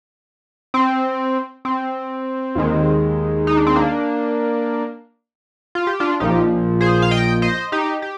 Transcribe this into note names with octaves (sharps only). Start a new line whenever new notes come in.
C4
C4
D#2 D#3 G#3
D#4
D4
C4
A#3 D4
F4
G4
D4 F4
A#1 A#2 F3 D#4 G4
G#4 C5
F5
D#5 G5
C5 D#5
D#4 G4
G4